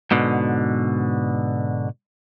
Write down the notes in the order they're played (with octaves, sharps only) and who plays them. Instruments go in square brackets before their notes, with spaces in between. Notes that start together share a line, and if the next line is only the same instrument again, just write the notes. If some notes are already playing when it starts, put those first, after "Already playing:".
[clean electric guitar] G#2 B2 D3